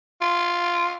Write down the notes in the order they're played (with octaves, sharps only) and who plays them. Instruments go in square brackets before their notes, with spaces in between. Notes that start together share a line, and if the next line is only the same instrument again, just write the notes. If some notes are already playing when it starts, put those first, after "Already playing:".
[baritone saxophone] F4